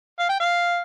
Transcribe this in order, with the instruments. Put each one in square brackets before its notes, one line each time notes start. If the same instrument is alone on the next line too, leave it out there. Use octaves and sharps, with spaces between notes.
[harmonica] F5
G5
F5